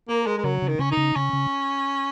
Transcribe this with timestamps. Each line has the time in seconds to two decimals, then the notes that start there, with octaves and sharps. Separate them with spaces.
0.08 A#3 A#4
0.26 G#3 A#4
0.37 G#3
0.44 C#3 F#3
0.62 C#3
0.68 D#3
0.79 C#3 C#4
0.91 D#4
0.97 C#3
1.15 C#3 C#4
1.33 C#3